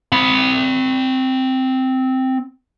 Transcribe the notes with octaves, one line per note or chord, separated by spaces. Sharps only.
C4 B5